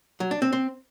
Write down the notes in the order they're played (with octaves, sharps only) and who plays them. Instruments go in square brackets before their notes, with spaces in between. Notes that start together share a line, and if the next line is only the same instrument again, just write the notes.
[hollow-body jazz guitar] F#3
D4
C4
C4